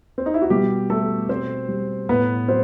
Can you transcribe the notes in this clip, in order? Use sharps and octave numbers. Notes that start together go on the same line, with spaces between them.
C4
D#4
E4
F#4
B2 G3 G4
G3 A3 A4
B2 C4 C5
G3
A2 B3 B4
F#3 C4 C5